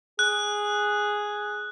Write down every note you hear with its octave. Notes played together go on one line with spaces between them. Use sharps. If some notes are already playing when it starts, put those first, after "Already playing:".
G#4 F#6